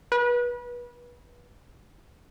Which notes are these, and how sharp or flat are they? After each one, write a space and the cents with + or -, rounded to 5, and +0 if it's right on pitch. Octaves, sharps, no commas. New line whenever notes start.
B4 -25